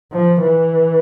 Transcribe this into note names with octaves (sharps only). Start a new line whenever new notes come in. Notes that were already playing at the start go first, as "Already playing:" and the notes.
F3
E3